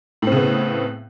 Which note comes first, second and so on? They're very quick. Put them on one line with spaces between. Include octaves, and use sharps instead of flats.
A2 C4 C#3 B3